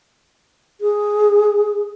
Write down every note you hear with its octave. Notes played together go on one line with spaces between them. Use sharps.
G#4